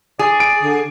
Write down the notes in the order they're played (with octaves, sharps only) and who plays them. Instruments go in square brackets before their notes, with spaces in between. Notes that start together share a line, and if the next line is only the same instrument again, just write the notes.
[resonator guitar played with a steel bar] G#4 [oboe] D5
[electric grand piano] D7
[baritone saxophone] D3